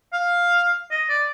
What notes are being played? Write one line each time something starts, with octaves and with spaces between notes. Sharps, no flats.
F5
D#5
D5